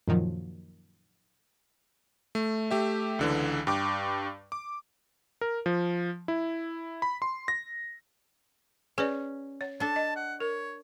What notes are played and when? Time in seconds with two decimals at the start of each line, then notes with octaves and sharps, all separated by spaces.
0.08 F#2 A#2 D#3 F3 F#3
2.35 A3
2.71 A3 G4 E5
3.19 C#2 D3 E3
3.67 G2 G5 D6
4.52 D6
5.41 A#4
5.66 F3
6.28 E4
7.02 B5
7.22 C6
7.48 A#6
8.98 C#4 G#4 B4 D5
9.61 C#5
9.80 D4 A4 A5
9.96 D#5
10.16 F#5
10.40 A#4 C#5